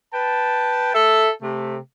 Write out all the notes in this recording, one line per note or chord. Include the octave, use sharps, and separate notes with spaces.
B4 G5 A5
A4 E5
C3 A3